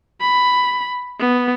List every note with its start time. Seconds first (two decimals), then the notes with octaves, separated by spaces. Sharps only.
0.21 B5
1.20 B3